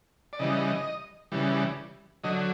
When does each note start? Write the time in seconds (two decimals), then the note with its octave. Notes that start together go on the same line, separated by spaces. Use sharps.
0.33 D5
0.39 C#3 E3 G3 D#5
1.32 C#3 E3 G3
2.24 D3 F#3 D#5